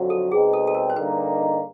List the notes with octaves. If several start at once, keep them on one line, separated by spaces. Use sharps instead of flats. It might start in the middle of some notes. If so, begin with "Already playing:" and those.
Already playing: F2 D3 F#3
A4
B2 G3 C4 D#4 G#4
A4
A4
A#4
C5
G2 D3 G3 A#3 D#4 B4